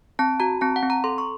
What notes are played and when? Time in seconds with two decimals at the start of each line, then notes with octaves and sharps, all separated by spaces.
0.19 C4 A5
0.40 F#4 A#5
0.61 C4 A5
0.76 F#5
0.83 C4
0.90 A#5
1.04 A4 C6
1.18 C#6